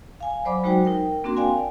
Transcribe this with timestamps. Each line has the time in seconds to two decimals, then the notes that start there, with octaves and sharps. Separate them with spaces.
0.21 F5 G#5
0.45 F#3 C5 D5 B5 D6
0.63 F#3 G#3 D#4 F#4 C5 G5
0.85 D#4 A#4 G5
1.24 A#3 C4 D4 F#4 A#4 C6
1.37 D5 F5 G5 G#5